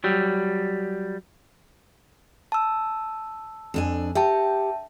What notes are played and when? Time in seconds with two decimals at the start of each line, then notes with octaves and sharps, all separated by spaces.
0.04 F#3 G3
2.52 A5 E6
3.74 F2 D4 G#5
4.15 G4 E5 G5 A5